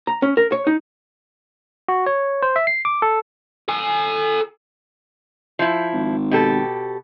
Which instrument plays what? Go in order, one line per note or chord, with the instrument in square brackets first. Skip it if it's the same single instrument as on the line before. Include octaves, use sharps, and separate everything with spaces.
[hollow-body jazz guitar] A#5
C#4
A#4
C#5
D#4
[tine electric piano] F#4
C#5
C5
E5
C7
D6
A4
[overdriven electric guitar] A4 G#5
[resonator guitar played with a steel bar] F3 E4
[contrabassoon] G#1
[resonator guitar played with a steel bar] B2 G4 A4